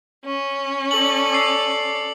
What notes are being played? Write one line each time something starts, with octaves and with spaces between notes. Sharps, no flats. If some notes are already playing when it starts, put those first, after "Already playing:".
C#4
A4 D5 F#7
D6 E6 C7